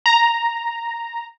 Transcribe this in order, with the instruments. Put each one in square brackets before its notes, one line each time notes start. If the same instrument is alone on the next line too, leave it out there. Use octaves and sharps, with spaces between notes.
[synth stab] A#5